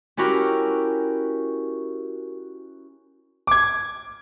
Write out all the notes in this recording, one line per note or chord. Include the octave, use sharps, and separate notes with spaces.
C#4 E4 F#4 G4 A#4
D6 G#6